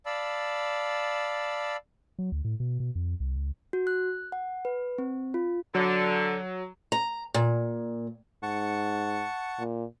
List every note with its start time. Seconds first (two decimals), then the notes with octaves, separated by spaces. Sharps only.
0.06 D5 F5 A5 B5 E6
2.19 F#3
2.32 D2
2.44 A2
2.60 B2
2.80 B2
2.95 F2
3.20 C2
3.36 C#2
3.73 F#4
3.87 F#6
4.32 F#5
4.65 B4
4.98 C4
5.34 F4
5.75 D3 F#3
6.92 A#5
7.34 A#2
8.43 G#2 F#5 A5 C#6
9.59 A#2